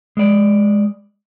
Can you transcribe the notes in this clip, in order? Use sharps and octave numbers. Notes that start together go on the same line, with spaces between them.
G#3 D5